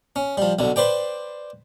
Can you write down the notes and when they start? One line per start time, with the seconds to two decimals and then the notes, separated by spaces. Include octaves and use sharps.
0.16 C#4
0.37 F3 G3
0.59 B1 D3
0.76 B4 C5 D5 G5